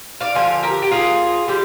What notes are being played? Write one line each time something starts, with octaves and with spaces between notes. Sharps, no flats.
D5 F5
D3 F3 F5 G#5
G4 A#4
G4
D3 F3 A#3 F4 G#4
D3 G3 G4